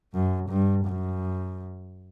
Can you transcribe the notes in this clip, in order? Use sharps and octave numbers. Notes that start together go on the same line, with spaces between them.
F#2
G2
F#2